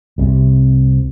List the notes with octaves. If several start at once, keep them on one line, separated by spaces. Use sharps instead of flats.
C2 C3